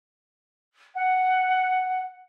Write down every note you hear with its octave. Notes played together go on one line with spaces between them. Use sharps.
F#5